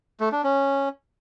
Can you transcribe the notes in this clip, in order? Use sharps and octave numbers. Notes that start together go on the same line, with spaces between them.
A3
D4
C#4